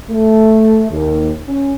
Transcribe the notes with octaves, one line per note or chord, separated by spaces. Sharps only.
A3
D#2
C#4